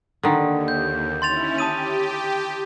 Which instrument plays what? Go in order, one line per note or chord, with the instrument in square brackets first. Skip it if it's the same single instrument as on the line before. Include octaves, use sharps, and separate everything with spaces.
[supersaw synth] D#2 [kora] D3 D#3
[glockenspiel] G6
[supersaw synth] C#4 E4 [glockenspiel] C6 A6 F7
[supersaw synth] G4 [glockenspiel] A5 D#6 D#7